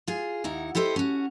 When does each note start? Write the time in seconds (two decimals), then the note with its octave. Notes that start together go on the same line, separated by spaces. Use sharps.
0.08 F4 G#4
0.44 D#2 D#4 E4 F#5
0.75 E4 G4 A4 C5 D#5
0.96 C#4 F#4